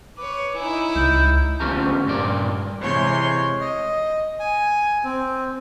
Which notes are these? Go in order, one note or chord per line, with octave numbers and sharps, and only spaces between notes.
B4 C#5 D6
D#4 E4 G#5
C#2 G6
D2 F3 C#4 G4 A#5
G2 A#2 D5
C3 E3 G#3 C#5 C6 G6
D#5
G#5
C4